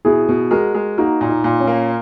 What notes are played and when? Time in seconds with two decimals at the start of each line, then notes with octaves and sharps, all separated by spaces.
0.05 B2 E4 G#4
0.29 B2
0.51 G#3 F#4 A#4
0.75 G#3
0.98 A#3 D#4 F#4
1.21 A#2
1.29 D#4
1.44 A#2
1.60 C#4
1.67 A#3